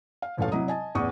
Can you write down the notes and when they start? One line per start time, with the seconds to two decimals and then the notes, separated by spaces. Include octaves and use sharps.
0.22 F5
0.37 E1 A1 F3 A4 C#5 F5
0.52 C3 F#3 E4 D#5 A#5 D#6
0.68 D#5 G#5 A5
0.95 A1 E2 D5 C#6 D#6